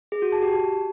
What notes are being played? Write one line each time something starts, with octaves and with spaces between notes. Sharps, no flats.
G#4
F#4
A5
G4